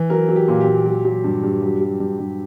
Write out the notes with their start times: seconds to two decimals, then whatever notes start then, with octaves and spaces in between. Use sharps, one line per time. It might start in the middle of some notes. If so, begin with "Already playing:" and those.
Already playing: E3
0.10 F#3 A#4
0.29 F#3
0.36 G4
0.48 A#2
0.60 G4
0.67 A#2
0.86 F#3
1.05 F#3
1.24 G2
1.43 G2
1.62 F#3
1.81 F#3
2.00 G2
2.19 G2